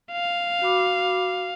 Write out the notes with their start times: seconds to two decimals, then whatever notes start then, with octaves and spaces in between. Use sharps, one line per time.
0.12 F5
0.62 F#4 B5 D6